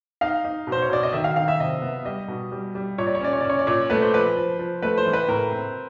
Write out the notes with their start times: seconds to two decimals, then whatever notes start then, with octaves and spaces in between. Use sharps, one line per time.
0.21 D#4 F5
0.45 D#4
0.67 B2
0.72 C5
0.82 C#5
0.89 B2 D5
1.03 D#5
1.13 D#3 E5
1.24 F5
1.36 D#3 F5
1.48 E5
1.60 C3 D#5
1.82 B3
2.05 G3 D#5
2.28 B2
2.52 G3
2.75 G3
2.98 A#2 C#5
3.07 D5
3.15 C#5
3.21 C#4 D5
3.33 C#5
3.41 D5
3.44 C#4 C#5
3.59 D5
3.67 A#2 C#5
3.90 A3 B4
4.03 C5
4.13 F3 B4
4.36 F3
4.59 F3
4.82 A3 B4
4.97 C5
5.06 E3
5.13 B4
5.28 A2 A#4
5.51 C4